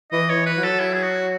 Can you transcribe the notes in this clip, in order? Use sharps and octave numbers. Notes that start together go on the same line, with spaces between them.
E3 D#5
C#5
E3
B4
F#3
A4
E4
G#4
F#4